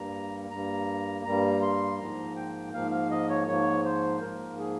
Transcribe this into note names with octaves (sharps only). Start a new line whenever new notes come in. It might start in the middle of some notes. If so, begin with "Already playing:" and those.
Already playing: G2 G3 A#3 A#5
G2 G3 A#3 A#5
G2 G3 A#3 A#5
C6
G#2 F3 A#3 A#5
G5
G#2 F3 A#3 F5
F5
D#5
C#5
G#2 F3 A#3 C#5
C5
G#2 F3 A#3 A#4
G#4